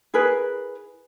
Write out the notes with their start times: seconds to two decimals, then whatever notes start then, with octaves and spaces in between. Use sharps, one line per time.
0.14 E4 G#4 A#4 B4